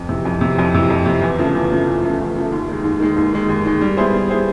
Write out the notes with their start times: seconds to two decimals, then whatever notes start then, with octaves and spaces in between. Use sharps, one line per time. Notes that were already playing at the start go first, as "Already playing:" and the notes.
Already playing: F2
0.09 C3 E3
0.25 F2
0.41 C3 E3
0.58 F2
0.74 C3 E3
0.90 F2
1.06 C3 E3
1.22 E2
1.38 C#3 F3 A3
1.55 E2
1.71 C#3 F3 A3
1.87 E2
2.03 C#3 F3 A3
2.19 E2
2.36 C#3 F3 A3
2.52 D#2
2.68 D#3 G#3
2.84 D#2
3.00 D#3 G#3
3.16 D#2
3.33 D#3 G#3
3.49 D#2
3.65 D#3 G#3
3.81 G3
3.97 B3 E4 G#4 C5
4.14 G3
4.29 B3 E4 G#4 C5